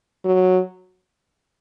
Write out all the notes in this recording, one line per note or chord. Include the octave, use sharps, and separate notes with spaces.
F#3